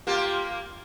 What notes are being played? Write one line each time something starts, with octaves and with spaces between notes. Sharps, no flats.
A#3 F4 G4